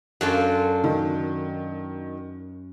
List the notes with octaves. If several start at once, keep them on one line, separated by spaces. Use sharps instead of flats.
F#2 F#3 D4 F4 A4
D#3